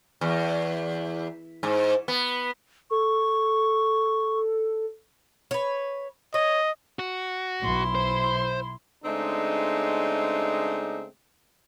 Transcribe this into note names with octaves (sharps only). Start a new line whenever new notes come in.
E2
G#2
B3
A4 C#6
B4 C#5
C#5 D#5
F#4
B1 E4 C6
C5
C#3 G#3 A3 C4 D4 D#4